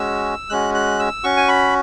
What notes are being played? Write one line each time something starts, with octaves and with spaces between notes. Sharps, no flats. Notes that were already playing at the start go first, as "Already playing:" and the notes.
Already playing: G#3 C#4 F#4 E6
G#3 C#4 F#4 F#6
F#6
E6
C#4 F#4 C#6
G#5
B5